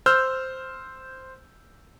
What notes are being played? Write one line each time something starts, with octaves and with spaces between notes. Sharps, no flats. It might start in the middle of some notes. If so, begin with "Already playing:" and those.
C5 E6 F6 G6